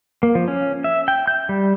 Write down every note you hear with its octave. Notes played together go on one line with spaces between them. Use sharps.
A#3
F3
C#4
E5
G5
G6
G3